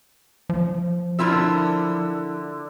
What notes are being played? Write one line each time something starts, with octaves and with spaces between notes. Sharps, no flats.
F3
D3 E4 F4 A#4 E5